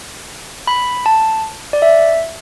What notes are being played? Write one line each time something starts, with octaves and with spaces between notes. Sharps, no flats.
B5
A5
D5
E5